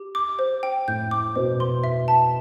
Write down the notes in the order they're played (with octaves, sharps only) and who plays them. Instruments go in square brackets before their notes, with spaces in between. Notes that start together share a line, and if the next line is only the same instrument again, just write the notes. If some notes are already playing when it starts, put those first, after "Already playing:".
Already playing: [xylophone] G4
D6
C5
G5
[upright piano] A2 [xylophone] G6
[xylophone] D6
[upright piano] B2 [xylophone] C5
[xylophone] C6
E5
A5